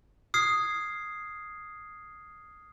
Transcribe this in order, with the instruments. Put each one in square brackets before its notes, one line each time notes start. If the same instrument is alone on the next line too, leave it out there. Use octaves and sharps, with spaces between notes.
[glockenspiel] D#6 F6 G#6 C7